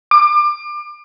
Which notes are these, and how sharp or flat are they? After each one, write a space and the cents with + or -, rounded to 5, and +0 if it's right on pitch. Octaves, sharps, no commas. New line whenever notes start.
D6 +30